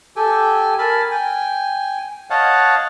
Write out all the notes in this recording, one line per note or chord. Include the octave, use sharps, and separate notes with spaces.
G4 A4 G5 G#5
A#4 G#5 A5 B5
G5 G#5
C#5 D#5 F5 F#5 A5